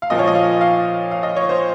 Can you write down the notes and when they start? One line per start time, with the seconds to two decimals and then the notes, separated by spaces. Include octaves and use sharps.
0.02 F5
0.10 A#2 F3 D#5
0.19 C#5
0.28 D#5
0.35 F5
0.61 F5
1.11 F5
1.23 D#5
1.36 C#5
1.49 C5